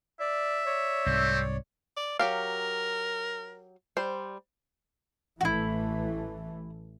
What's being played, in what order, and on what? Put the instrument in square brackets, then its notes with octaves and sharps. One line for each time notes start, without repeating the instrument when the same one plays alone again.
[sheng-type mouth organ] D5 [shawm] E5
[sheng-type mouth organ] C#5 D5
[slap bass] C2 G#2 [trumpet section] A3 C4
[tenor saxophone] D5
[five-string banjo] F#3 G4 F5 [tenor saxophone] A#4
[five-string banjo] G3 C5
[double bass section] A1 E3 A3 [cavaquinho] E4 F#4